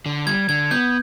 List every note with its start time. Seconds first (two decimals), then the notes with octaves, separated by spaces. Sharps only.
0.06 D3
0.27 G3 G#6
0.49 D3 G#6
0.71 B3 G6